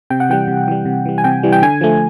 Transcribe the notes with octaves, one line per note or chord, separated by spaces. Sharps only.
C3 G5
F#5
E3 G3 G5
C3
E3 G3
C3
E3 G3
G#5
C3 G5
E3 G3
G5
D3 G#5
F3 A3